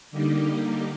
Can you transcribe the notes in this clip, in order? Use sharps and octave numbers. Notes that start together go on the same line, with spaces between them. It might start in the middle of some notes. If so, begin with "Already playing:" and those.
D3 G3 A#3 D#4 G4